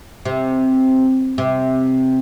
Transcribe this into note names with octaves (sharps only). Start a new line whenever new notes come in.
C3
C3